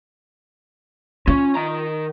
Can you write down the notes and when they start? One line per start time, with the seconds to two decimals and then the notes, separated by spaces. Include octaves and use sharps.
1.27 C#4 F4
1.55 D#3 A#5